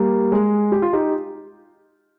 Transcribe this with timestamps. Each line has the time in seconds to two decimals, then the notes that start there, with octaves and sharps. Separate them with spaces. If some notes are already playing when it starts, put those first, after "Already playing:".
Already playing: G3 A#3
0.32 G#3
0.72 G4
0.82 F4
0.93 D#4 G4